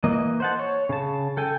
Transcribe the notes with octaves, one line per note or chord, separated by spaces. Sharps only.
E3 A#3 D#5
C5 F#5 A5
C#5
C#3 A5
A4 G5 G#5